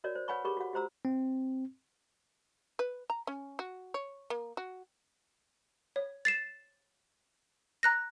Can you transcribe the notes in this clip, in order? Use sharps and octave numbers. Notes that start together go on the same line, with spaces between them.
F#4 A#4 C#5 D5
C5
B4 C#5 F#5 G#5 B5 C#6
G4 G#4 A#4 B5 C#6
F#4 F#5
F#4 G4 C5 A#5 E6
C4
B4
A#5
C#4
F#4
C#5
A#3
F#4
C#5
A6 C7 E7
A#5 F#6 A#6